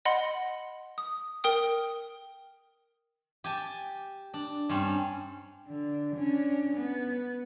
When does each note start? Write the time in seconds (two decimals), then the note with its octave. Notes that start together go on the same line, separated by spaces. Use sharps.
0.05 D#5 F#5 B5 C6
0.98 D#6
1.44 A#4 G5 D#6
3.44 G4 G#5 A5
4.34 D4
4.69 G2 C4 C#4
5.68 D3
6.16 C#4 D4
6.77 B3